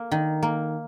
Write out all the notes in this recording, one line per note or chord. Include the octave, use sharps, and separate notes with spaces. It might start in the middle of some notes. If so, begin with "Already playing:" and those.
Already playing: A#3
D#3
A#3